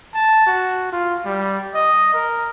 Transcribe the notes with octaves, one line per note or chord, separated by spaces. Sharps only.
A5
F#4
F4
G3
D#5
A#4